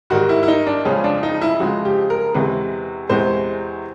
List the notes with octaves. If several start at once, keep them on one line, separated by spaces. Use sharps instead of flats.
G#2 D#3 G3 F#4
E4
E4
D#4
D4
F2 C#3 F3 G#3 C#4
D4
D#4
E4
F2 C#3 F3 G#3 F#4
G4
A#4
E2 C3 E3 G#3 B4
E2 C3 E3 G#3 C5